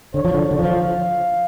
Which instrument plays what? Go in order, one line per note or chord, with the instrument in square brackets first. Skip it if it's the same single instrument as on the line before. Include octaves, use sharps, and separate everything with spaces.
[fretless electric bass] D3 [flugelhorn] C#5
[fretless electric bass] F3
D3
D3
[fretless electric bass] F3 [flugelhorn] F5